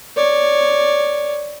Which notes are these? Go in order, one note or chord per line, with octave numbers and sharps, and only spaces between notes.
C#5 D5